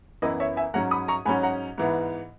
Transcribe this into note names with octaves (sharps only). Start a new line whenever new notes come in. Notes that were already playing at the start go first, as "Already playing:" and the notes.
F#2 E3 B3 E4 B4 D#5
C#5 E5
E5 G#5
G#2 F#3 C#4 F#5 A#5
B5 D#6
A#5 C#6
G#2 F#3 C#4 G#5 B5
F#5 A#5
G#2 E3 B3